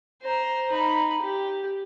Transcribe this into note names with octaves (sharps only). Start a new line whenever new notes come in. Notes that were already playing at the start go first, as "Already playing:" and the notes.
C5 A#5
D#4 B5
G4